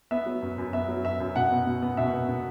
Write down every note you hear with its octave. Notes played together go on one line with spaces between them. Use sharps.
B3 E5
F#3
F#2
F#2
B3 E5
F#3
F#2 E5
F#2
B2 F#5
B3
B2
B3
B2 E5
B3
B2